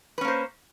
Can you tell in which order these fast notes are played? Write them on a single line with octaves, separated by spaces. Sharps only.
B4 C#4 A#3 C5